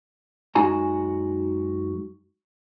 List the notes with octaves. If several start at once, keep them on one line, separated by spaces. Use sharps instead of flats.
F#2 G#3 D#4 F#4 G#5 A#5